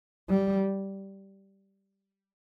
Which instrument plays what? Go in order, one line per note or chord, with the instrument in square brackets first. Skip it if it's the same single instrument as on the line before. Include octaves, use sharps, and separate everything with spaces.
[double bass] G3